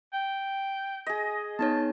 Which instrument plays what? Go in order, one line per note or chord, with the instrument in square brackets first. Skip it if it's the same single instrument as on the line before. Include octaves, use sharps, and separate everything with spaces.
[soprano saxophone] G5
[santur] G#4 D#5
[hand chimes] B3 D#4 C#5 [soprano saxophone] A5